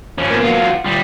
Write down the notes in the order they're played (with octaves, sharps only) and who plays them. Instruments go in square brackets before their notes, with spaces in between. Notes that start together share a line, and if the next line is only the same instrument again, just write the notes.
[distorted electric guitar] F3 C#4
[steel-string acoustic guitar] A#3 B3
[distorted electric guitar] F#3 F4
[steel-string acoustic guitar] F#5
[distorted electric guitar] G3 F4